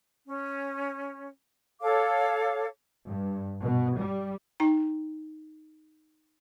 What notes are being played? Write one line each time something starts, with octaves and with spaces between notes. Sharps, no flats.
C#4
A4 C#5 F5 D6
G2
B2
G3
D#4 G5 A#5